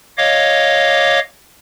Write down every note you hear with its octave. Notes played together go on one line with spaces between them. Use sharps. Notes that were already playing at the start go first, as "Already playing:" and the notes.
C#5 D#5 F5 D6